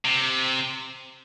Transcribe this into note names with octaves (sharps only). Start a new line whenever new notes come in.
C3